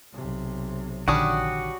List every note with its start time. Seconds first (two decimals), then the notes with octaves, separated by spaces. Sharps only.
0.13 B1 C3
1.08 A#1 D3 D#3 G3 C#4 D4 F#4 D#6